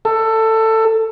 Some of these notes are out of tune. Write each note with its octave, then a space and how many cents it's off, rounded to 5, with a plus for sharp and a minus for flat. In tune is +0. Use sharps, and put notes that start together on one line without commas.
A4 +15